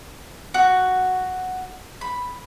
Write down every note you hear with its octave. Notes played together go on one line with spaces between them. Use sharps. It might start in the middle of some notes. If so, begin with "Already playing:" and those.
F#4
B5